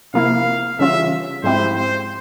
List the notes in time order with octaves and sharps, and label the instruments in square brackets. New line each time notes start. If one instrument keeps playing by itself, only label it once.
[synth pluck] C3 F3 A#3 E4 [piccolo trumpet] F5
[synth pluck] C#3 E3 G3 C#4 F4 [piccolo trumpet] E5
[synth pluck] G#2 F3 C4 E4 G4 [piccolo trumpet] C5
[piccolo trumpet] C5